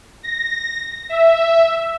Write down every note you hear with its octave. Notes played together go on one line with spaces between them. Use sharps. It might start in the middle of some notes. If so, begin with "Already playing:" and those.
A#6
E5